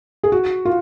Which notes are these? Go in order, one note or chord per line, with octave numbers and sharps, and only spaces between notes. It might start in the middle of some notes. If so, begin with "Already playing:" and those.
G#4
F#4
F4